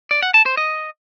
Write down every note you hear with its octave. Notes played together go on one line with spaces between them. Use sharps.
D5
F#5
A5
C5
D#5